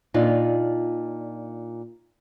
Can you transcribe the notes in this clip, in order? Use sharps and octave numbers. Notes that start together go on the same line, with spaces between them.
A#2 D4 D#4 F4